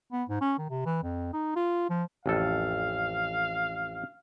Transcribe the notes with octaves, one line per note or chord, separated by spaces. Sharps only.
B3
G#2
C#4
D#3
C3
E3
F2
D#4
F4
F3
A1 F2 A4 F5